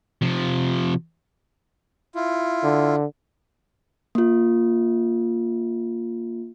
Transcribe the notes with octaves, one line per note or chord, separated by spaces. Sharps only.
C3 F3
E4 F4
D3
A#3 F4